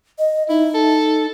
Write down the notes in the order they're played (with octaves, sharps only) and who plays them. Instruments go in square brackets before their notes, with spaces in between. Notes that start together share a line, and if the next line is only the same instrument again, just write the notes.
[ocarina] D#5
[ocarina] D#4 [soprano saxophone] E4
[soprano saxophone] A4